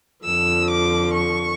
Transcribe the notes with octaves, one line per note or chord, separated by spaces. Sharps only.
F2 D3 F3 E6
D6
C#6